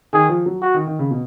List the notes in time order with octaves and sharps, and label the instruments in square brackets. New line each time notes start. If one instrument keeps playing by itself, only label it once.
[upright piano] D#3 [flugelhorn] G#4
[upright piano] F3
F#3
[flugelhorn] F#4
[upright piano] D#3
D#3
C#3
B2